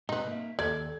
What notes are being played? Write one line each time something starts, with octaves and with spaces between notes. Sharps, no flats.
G#2 C3 D#4 B4
A#3 E5
D#2 A4 D5 G#6